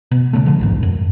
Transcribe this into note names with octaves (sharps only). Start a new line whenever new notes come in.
B2
C#3 G#3 A3
A#2 D3 F3
A#1 D#2 G#2
F#2